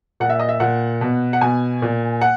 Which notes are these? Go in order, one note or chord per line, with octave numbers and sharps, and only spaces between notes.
A#2 F#5
E5
D#5
E5
A#2 F#5
B2
F#5
B2 G#5
A#2
F#5